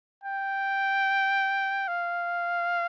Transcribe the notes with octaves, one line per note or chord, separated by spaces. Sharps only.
G5
F5